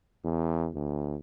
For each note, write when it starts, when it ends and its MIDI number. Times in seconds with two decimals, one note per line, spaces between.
0.24 0.69 40
0.75 1.17 38